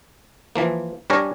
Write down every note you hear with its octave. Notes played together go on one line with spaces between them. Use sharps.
E3 F3 A#3
G3 D4 A#4 C#5 G#5 A#5